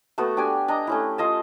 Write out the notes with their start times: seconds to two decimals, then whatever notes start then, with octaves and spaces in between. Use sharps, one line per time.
0.18 A3 B3 F#4
0.37 D4 G4 D5 G#5
0.68 D4 D#5 A#5
0.87 A3 C#4 E4
1.18 F4 D#5 A5